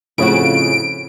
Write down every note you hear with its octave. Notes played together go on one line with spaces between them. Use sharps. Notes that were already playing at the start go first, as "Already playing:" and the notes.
F2 A2 C#3 F#4 D7